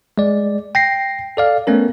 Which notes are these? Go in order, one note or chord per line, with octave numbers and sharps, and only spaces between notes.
G#3 D5
G5 A#6 C7
A4 D5 F5
A3 B3 C#4 A#4